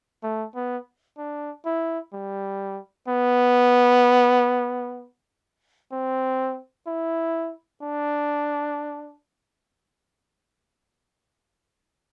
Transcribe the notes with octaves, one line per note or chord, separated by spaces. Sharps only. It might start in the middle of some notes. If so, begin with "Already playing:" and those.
A3
B3
D4
E4
G3
B3
C4
E4
D4